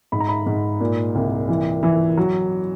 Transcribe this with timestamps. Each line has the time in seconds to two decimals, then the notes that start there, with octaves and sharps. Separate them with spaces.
0.12 G#2 B5
0.20 A#5
0.29 B5
0.46 G#2
0.80 A#2
1.15 C2
1.49 E3
1.83 E3
2.17 F#3